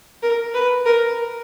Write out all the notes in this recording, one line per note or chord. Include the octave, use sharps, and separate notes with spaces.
A#4
B4
A#4